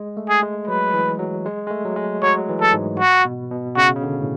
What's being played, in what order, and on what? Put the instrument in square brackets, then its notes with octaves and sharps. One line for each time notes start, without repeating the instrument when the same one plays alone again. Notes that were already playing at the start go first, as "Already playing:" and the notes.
Already playing: [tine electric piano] G#3
A3
[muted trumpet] G#4
[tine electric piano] G#3
[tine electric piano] F#3 [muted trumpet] B4
[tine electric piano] E3
F#3
G#3
G#3
A3
F#3
G#3
[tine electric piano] F#3 [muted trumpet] C#5
[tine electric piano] E3
[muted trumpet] A4
[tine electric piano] G#2
[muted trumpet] F#4
[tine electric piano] B2
B2
[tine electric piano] C#3 [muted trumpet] F#4
[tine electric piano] C#3
D3
A2